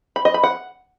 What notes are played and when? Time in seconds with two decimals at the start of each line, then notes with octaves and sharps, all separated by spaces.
0.16 B5
0.25 D#5
0.34 B5
0.43 F#5